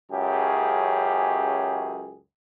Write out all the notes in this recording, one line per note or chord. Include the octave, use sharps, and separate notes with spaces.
C#2 F#2 G4 G#4